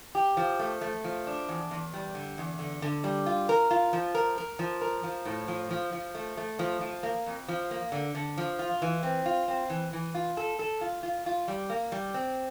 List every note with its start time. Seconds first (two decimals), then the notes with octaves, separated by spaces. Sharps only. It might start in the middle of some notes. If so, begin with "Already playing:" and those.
0.15 G4
0.37 F3
0.59 A3
0.81 A3
1.04 F3
1.27 D4
1.49 E2
1.71 E2
1.94 G3
2.15 D3
2.38 E2
2.59 D3
2.82 D3
3.04 G3
3.26 F4
3.49 A#4
3.71 F4
3.93 F3
4.15 A#4
4.38 A#4
4.59 F3
4.82 A#4
5.04 F3
5.25 A2
5.48 F3
5.71 F3
5.93 F3
6.15 A3
6.37 A3
6.59 F3
6.81 F3
7.03 A#3
7.27 F2
7.48 F3
7.71 A#3
7.92 D3
8.15 D3
8.38 F3
8.59 F4
8.82 E3
9.03 C4
9.26 F4
9.48 C4
9.70 E3
9.93 E3
10.15 F4
10.37 A4
10.59 A4
10.81 F4
11.03 F4
11.26 F4
11.48 G3
11.70 A#3
11.92 G3
12.14 C4